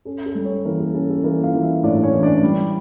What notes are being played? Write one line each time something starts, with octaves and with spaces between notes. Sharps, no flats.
C#4 A4
A4
G3
C#4 C#5
E3 A#3 A#4
A4
C#4 A4
A4
E3 A#3 A#4
F4 F5
E3
E4 E5
A2 D4 D5
C#4 C#5
E3
D4 D5
G3